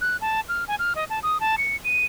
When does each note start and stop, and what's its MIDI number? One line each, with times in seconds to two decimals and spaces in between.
0.01 0.17 90
0.21 0.40 81
0.49 0.64 89
0.68 0.75 80
0.79 0.93 89
0.95 1.04 75
1.10 1.19 81
1.23 1.40 87
1.40 1.56 81
1.58 1.76 97
1.84 2.06 99